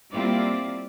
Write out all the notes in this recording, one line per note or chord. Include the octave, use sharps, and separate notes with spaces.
G3 A#3 C4 E4 F4 D5